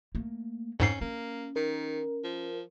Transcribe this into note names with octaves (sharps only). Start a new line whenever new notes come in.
A3 A#3
F2 G#2 C#4 C7
A#3 C#4
D#3 A#4
F3